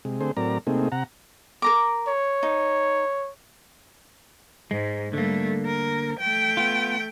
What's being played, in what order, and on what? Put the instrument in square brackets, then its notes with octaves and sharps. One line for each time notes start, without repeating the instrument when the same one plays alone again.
[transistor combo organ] C3 G#3
D3 A3 C4 G#4 C5
A2 F#3 C4 A#4 D5 A#5
C3 A3 A#3 C4 D#4 G#4
C3 F#5 A#5
[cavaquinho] A#4 A#5 D6
[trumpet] C#5
[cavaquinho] D#4
[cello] G#2 [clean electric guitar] G#3
[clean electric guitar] D3 A#3 [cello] G3 A3
[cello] A#4
A3 G5
[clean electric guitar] B3 F4